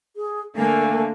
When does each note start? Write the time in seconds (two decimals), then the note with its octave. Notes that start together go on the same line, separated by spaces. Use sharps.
0.16 G#4
0.57 D3 A3 A#3 G#5